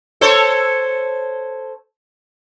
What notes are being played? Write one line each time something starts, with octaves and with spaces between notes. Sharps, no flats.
A4 C5 C#5